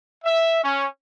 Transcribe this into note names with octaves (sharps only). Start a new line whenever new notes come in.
E5
C#4